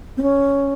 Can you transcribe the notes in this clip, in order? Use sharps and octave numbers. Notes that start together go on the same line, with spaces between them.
C4
C#4